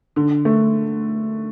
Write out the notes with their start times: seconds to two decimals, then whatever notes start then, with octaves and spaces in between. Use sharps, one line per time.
0.16 D3
0.45 A3